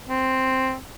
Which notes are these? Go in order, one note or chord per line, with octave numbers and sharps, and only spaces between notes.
C4